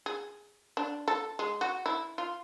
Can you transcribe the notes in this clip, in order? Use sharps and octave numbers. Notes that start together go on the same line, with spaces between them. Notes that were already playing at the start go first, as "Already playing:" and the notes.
G#4
D4
A4
G#3
F#4
E4
F4